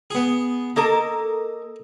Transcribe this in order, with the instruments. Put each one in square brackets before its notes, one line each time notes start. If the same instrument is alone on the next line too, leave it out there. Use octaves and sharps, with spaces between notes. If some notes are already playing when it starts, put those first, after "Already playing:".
[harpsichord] B3 G#4
[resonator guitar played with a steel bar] A#3 A4 A#4 [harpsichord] D#5